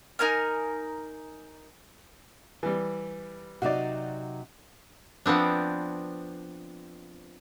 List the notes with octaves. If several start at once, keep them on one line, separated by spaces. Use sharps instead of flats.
D#4 A#4 G#5 F6
E3 G3
C3 F#3 D#4 F#4 D5
F3 B3 C4 D4